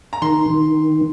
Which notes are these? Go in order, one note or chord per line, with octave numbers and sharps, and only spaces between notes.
A#5
D#3 C6
D#3